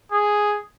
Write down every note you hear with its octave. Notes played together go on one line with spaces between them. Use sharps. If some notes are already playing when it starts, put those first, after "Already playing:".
G#4